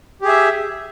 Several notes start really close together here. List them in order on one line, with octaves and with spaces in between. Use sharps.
G4 G#4 E5